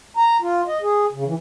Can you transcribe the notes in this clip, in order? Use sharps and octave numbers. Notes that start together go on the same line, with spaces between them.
A#5
F4
D#5
G#4
C#3
E3